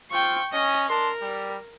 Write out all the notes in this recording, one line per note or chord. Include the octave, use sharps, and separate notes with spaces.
C4 F4 G5 C#6
C#4 D#5
D4 A#4 A5 C6
G3